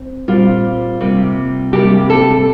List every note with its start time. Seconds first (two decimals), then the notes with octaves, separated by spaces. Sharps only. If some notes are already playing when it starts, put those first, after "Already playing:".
Already playing: C4
0.28 A#2 G3 C4 F4
1.01 C3 G3 A#3
1.73 C3 G3 A#3 G4
2.10 A4